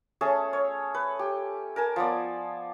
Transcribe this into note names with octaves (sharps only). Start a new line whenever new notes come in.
A3 C#4 G#4 A4
C#5
B4
G4
A#4 G#5 A5
F3 B3 D5